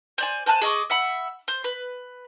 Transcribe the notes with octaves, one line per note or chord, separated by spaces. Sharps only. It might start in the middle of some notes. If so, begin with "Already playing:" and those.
C5 D5 G#5
C5 G#5 A5 F#6
G#4 D#5 C#6 D6
E5 F#5 B5
C5
B4